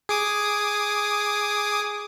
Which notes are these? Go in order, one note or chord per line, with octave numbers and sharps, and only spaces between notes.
G#4 D6 D#6